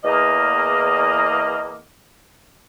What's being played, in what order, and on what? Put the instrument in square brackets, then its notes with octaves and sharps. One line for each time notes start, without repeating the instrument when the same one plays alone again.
[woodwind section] E2 A#3 D#5